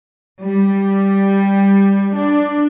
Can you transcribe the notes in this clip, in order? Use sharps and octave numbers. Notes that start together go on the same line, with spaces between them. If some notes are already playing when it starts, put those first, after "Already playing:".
G3
D4